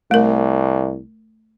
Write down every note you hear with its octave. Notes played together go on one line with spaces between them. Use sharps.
C2 A3 A#4